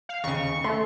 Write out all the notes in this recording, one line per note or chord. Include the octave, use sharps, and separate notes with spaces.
F5
D#2 C#3 C#6
A3 C6